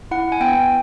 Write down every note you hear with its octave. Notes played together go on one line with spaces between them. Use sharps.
E4 F#5
G#5
B3 G5